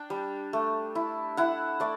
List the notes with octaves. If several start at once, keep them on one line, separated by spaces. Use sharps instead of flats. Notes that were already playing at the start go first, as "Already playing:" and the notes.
Already playing: D4 G5
G3
A3
E4
E4 F#5
A3 D5